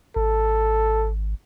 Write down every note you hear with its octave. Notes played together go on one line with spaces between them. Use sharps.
G#1 A4